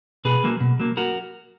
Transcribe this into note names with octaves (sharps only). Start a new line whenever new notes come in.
B2 G#4 B4
F#3 A#3
B2
F#3 A#3
F#4 A#4